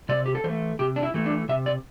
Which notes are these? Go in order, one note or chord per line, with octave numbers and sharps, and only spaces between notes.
C3 D5
G4
A4
E3 A3 C5
C3 G4
D4
E4
E3 A3
D4
C3 E5
D5